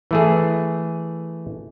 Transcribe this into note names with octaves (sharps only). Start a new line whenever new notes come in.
E3 A3 G#4